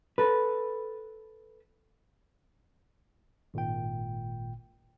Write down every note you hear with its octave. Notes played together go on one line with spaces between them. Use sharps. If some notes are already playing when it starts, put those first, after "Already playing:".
A4 B4
G#1 A#2 G5